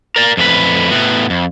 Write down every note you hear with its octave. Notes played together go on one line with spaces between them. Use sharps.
A#4 D5
F2 A2 F#4 B4
A2 B3 F#4
F2